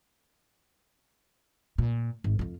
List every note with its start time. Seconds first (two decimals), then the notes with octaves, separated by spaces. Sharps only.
1.78 A#2
2.24 G#1
2.39 F2 F4